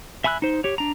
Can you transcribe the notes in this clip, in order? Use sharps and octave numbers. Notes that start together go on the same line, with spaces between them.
E5 G#5 B5 E6 F#6
D#4 C5
G4 C#5
D4 A#5